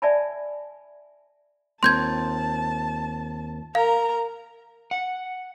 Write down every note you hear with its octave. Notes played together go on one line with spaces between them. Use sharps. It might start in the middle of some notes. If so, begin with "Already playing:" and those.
D5 E5 G#5 A5 B5
D#2 C4 F4 A5 C6 G6 G#6
A#4 F5 A#5
F#5